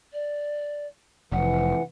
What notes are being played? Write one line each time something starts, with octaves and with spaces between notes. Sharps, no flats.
D5
F1 E3 F#5